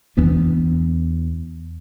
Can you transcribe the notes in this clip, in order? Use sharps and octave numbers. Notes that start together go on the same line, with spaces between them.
E2 E3 B3 D4